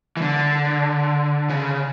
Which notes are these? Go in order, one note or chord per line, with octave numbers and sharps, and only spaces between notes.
E3
D3
C#3